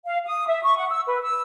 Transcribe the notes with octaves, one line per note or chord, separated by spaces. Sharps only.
F5
D#6
E5
C#6
F#5
E6
B4
E6